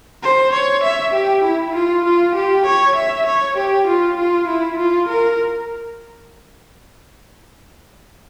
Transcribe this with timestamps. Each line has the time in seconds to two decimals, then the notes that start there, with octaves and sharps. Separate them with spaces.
0.23 C5
0.53 C#5
0.84 E5
1.14 G4
1.44 E4
1.75 F4
2.05 F4
2.35 G4
2.66 C#5
2.96 E5
3.27 C#5
3.57 G4
3.87 F4
4.17 F4
4.48 E4
4.79 F4
5.09 A#4